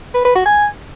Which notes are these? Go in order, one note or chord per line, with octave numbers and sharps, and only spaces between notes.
B4
B4
F#4
G#5